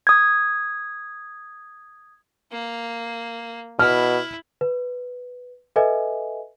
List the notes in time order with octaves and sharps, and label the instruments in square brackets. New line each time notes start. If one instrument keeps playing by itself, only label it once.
[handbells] D#6 G#6
[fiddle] A#3
[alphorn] B2 [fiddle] E4 [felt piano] F6
[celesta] B4
A4 B4 D#5 E5 G#5